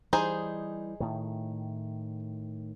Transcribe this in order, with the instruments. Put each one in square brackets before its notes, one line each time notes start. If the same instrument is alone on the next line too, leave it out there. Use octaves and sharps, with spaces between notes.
[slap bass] E3 G3 [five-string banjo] D#4 G#4 C5
[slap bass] A2 D#3